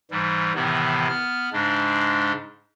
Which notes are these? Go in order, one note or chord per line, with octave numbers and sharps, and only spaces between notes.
G#2 E3 G3
A2 C3 D#3 E3 B3
B3 F6
G#2 C#3 G#3 D4